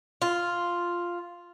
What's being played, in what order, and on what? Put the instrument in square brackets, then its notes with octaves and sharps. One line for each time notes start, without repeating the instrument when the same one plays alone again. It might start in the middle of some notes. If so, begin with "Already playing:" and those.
[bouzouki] F4